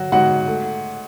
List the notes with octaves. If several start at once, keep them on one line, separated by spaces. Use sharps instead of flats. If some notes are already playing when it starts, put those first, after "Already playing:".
Already playing: F#3 F#4
G#2 F#4 F#5
A3